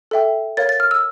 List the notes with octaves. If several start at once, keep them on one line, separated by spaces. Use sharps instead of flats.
A4 E5 G5
A#4 C#5 F5 A6
A6
F6
E6